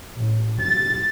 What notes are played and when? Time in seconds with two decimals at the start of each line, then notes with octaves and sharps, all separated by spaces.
0.17 A1
0.60 A6